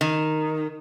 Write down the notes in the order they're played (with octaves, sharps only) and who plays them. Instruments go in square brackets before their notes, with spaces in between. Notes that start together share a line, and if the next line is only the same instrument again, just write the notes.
[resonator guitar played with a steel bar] D#3